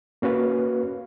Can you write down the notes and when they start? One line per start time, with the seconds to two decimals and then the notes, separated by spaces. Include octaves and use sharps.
0.22 A#3 C#4 F#4 B4 F5